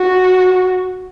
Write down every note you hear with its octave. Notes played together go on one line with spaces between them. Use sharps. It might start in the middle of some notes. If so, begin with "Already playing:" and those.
Already playing: F#4